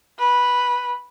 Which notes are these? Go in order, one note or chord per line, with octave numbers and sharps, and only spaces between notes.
B4